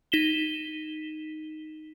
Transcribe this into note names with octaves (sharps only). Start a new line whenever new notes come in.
D#4 B6 E7 G7